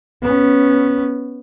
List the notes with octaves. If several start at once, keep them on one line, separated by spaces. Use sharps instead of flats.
B3 C#4